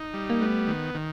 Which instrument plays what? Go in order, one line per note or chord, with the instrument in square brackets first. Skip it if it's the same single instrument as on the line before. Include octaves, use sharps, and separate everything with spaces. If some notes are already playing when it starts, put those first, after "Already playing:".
Already playing: [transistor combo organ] D#4
G3
[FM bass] A#3
[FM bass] A3 [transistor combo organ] B3
[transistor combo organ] D#3
D#3